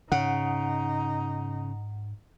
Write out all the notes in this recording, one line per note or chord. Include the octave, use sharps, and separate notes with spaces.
G#2 C#3 D#4 F#5